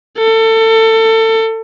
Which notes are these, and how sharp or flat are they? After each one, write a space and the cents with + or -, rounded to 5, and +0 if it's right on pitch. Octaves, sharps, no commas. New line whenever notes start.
A4 +25